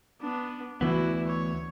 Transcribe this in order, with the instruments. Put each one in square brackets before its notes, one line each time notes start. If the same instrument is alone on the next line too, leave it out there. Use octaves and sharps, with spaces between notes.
[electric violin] B3 D4
[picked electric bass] D2 E3 B3 [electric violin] E4 F#4
[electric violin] C#5